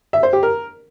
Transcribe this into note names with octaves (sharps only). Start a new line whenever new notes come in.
E5
C5
G4
A#4